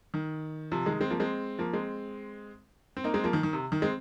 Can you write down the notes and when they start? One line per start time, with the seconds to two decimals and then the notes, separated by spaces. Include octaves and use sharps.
0.14 D#3
0.72 C3 F3
0.86 D#3 G#3
1.01 G#3 C4
1.10 F3 A#3
1.20 G#3 C4
1.59 F3 A#3
1.73 G#3 C4
2.97 C4
3.04 A#3 D#4
3.14 G#3 C4
3.24 F3 A#3
3.33 D#3
3.43 D#3
3.53 C3
3.72 D#3
3.82 G#3 C4